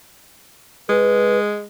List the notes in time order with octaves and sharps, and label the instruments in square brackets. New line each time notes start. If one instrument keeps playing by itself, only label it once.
[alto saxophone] G#3 [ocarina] B4